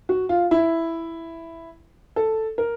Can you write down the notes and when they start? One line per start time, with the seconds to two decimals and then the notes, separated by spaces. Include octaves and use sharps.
0.09 F#4
0.29 F4
0.51 E4
2.16 A4
2.58 A#4